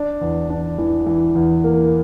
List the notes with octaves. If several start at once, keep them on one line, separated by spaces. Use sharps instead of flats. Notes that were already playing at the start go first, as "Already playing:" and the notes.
Already playing: D4
E2
D4
E3
E3
E2
A#3